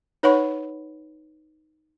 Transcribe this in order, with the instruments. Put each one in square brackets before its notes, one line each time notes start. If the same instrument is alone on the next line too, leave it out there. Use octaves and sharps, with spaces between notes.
[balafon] D#4 B4 C#5 F#5 B5 C#6